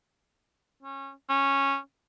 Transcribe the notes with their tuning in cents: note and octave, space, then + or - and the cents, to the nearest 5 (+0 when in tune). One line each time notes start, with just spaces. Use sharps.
C#4 -20
C#4 -10